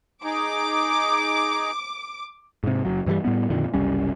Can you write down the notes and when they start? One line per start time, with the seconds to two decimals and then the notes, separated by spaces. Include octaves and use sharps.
0.24 D#4 G#4 D6
2.63 G#2 C3
2.85 F#1 D#2 F#3
3.06 G2 E3 F3 G3
3.25 A2 G3 B3
3.50 F2 A#2 D3 D#3
3.74 F#1 C2 G3 C#4